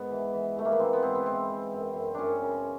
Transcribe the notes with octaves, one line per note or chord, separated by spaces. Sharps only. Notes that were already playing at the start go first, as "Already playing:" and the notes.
Already playing: G#2 B3
E3
E3
E3 A3
A#3
B3
E3 C4
B3
G#2 C4
B3
E3 C4
E3
F#2
F#2
F#2 C#4 D4
C#3